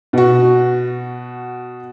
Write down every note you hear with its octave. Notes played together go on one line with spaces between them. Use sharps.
B2 F#4